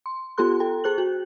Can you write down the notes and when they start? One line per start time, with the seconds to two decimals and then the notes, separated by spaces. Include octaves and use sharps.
0.06 C6
0.38 B3 F4 G4 A4 C6 F#6
0.60 A4 G5
0.84 G#4 C5 F#6 F#7
0.98 F#4